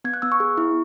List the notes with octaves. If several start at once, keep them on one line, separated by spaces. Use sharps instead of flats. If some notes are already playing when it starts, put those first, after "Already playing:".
B3 G#6
F#6
B3 E6
C#6
G#4
E4